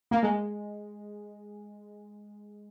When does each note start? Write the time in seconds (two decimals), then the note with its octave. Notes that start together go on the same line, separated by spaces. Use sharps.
0.11 A#3
0.23 G#3